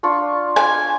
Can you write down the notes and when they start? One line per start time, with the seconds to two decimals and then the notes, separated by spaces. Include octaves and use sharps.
0.03 D4 F4 C#6
0.56 G#5